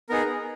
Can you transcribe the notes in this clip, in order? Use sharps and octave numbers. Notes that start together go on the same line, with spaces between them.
B3 D#4 G#4 A#4